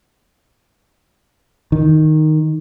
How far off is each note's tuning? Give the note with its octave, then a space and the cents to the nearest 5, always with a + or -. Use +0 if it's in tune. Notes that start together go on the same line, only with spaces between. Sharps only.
D#3 -5